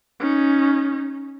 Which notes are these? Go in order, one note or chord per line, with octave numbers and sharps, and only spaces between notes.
C#4 D#4